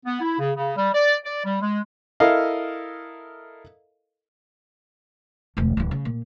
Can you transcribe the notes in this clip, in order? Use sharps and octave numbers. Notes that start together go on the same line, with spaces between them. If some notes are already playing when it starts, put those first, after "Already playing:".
B3
E4
C#3
C#3
G3
D5
D5
G3
G#3
E4 A4 A#4 D#5 F5
E1 D2
D1 E3
C#3
A#2